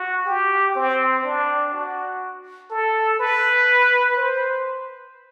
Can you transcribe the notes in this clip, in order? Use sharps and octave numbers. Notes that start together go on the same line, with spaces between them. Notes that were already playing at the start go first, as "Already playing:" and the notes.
Already playing: F#4
G4
C4
D4
F#4
A4
B4
C5